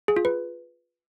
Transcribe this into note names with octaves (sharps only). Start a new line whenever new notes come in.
G#4
F4
B4